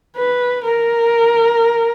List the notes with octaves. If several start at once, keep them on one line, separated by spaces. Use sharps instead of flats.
B4
A#4